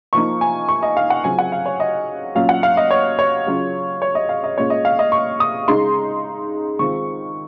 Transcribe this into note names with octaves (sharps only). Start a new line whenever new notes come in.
F3 A#3 D#4 C#6
G#5
C#6
D#5
F5
F#5
C#3 F#3 C4 F4 G#5
F#5
F5
C#5
D#5
A#2 F#3 C#4 F4 F5
F#5
F5
D#5
C#5
C#5
C#3 F#3 C#4 F4
C#5
D#5
F5
D#5
A#2 G#3 C#4 F4 C#5
D#5
F5
D#5
C#6
D#6
C#3 G#3 D#4 C6
D#3 G#3 C4 F4 C#6